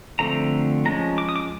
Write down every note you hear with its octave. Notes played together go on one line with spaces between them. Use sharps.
D3 F3 A3 C4 A#5
F3 G#3 C#4 A#5
D6
D#6
D6